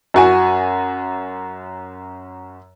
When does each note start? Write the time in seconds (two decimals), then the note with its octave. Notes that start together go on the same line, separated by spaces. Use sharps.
0.14 F#2 F#4 G#5